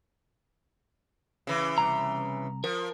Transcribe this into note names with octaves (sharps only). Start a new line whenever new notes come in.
C#3 E3
C2 A#5
F3 A#4